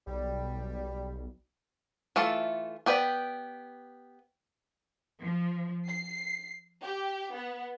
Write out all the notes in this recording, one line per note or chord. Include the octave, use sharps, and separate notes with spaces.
B1 G3
E3 A3 F4 A4
B3 G4 B4 D5 G5
F3
C7
G4
B3